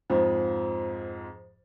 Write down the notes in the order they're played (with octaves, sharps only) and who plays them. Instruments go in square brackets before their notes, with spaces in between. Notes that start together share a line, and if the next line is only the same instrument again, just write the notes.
[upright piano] F2 G#2 F3